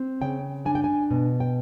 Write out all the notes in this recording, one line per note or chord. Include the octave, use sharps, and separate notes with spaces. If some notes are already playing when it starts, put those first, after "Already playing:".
Already playing: C4
C#3 G5
D4 G#5
G5
G#5
B2
G5